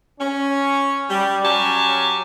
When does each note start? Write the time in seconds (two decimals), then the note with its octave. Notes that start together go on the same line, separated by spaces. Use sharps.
0.19 C#4
1.10 G3
1.44 F#3 C#4 G4 G#5 A5